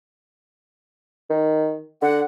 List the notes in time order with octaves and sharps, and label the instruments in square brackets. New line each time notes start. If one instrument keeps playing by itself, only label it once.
[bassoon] D#3
[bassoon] D3 [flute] F#5